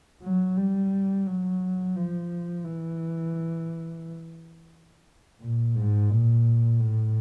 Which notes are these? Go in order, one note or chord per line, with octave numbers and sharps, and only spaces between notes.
F#3
G3
F#3
F3
E3
A#2
G#2
A#2
A2